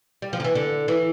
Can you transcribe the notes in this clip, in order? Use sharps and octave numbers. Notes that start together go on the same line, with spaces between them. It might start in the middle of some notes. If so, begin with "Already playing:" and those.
G3
F3
D3
E3
D3
E3